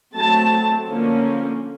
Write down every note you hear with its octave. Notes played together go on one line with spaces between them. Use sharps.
F#3 A3 C4 A5
D3 F3 A#3 C#4